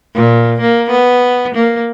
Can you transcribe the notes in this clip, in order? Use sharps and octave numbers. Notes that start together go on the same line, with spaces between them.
A#2
A#3
B3
A#3